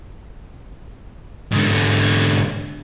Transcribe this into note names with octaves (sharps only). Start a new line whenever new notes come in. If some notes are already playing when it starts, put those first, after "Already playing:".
G#2 D3